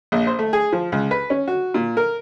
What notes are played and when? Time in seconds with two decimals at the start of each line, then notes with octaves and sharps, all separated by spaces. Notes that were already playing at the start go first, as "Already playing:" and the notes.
0.12 A#1
0.27 C5
0.39 A3
0.53 G#4
0.72 F3
0.92 C#2
1.11 B4
1.30 C#4
1.48 F#4
1.74 A#2
1.97 A#4